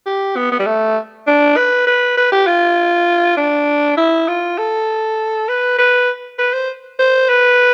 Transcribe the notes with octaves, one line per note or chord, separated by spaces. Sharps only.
G4
B3
B3
G3
A3
D4
B4
B4
B4
G4
F4
D4
E4
F4
A4
B4
B4
B4
C5
C5
B4